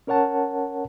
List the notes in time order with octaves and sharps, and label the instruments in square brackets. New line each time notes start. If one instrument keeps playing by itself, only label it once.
[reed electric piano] C#4 A#4 C#5 F#5 A5